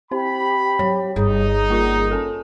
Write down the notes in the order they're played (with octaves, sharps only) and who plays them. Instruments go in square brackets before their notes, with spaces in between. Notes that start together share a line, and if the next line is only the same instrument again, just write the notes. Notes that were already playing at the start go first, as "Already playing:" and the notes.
[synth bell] C4 C5 [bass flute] G4 [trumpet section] B5
[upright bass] F#3 [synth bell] C#5
[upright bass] G1 G2 [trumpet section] D#4 [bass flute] G#4
[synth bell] A#3 F4 A#4
[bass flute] C#4 [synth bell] A4 G#5 A5